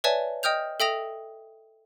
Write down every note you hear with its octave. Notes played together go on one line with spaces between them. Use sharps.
B4 C#5 D5 E5 G#5 A5
D#5 G5 D#6 F6 G6 F7
A4 E5 G5 D#6 A#6 F7